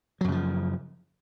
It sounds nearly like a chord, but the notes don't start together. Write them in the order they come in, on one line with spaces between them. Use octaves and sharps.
F#3 F#2 C#3 F3